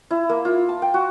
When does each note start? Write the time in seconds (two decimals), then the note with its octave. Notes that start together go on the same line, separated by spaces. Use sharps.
0.11 E4
0.29 A#3
0.45 F4
0.69 A5
0.82 G5
0.94 F#4